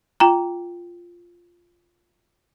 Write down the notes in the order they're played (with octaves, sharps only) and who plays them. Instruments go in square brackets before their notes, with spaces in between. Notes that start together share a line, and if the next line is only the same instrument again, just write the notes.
[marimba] F4 G5 A#5